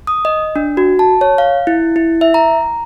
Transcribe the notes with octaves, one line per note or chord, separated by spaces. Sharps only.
D#6
D#5
D4
F#4
A5
C#5
F5
E4
E4
E5
A#5